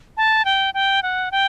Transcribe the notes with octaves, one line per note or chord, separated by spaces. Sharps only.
A5
G5
G5
F#5
G5